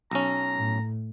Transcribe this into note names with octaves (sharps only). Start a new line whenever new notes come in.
B1 C#4 A#5
A2